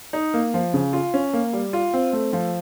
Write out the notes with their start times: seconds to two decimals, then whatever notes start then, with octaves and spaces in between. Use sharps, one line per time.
0.13 D#4
0.34 A#3
0.54 F3
0.73 C#3
0.93 F4
1.14 C#4
1.33 A#3
1.53 G3
1.73 F4
1.94 C4
2.13 A3
2.33 F3